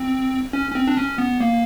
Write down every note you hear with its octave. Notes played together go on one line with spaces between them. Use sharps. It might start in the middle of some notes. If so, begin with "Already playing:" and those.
Already playing: C4
C#4
C#4
C4
D4
C#4
B3
A#3